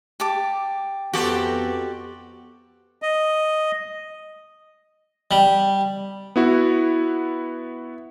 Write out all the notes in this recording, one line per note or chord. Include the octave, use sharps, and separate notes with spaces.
G4 A5 D6
F2 B3 F#4 G4 A4 A#5 C6
D#5
G3
B3 E4 F#4